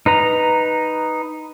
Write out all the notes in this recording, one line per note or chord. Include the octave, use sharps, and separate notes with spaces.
D#4 B4 A#5